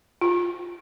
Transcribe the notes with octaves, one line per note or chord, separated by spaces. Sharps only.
F4